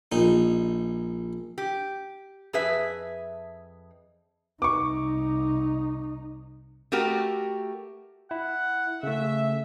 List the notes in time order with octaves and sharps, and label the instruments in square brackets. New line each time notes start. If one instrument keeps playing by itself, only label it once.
[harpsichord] A#1 D#4
[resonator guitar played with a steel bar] G4
F2 G#4 B4 E5
[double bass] C2 D#4 [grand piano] C#6 D6
[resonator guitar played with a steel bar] A3 F#4 G4 A#4
[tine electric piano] E4 [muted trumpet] F#5
[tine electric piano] C#3 A3 [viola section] E5